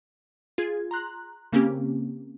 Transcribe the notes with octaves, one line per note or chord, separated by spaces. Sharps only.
F4 G#4 G#6
A#5 C6 F#6
C#3 A#3 C4 C#4 G4